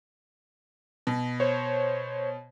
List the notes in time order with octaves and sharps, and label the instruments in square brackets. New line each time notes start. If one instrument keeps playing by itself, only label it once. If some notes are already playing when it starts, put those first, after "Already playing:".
[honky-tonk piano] B2
[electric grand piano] C5 C#5